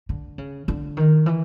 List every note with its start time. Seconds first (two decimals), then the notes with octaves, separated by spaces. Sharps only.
0.09 D3
0.38 C#3
0.68 D3
0.97 D#3
1.26 E3